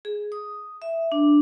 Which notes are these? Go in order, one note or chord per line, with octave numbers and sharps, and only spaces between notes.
G#4
D#6
E5
D4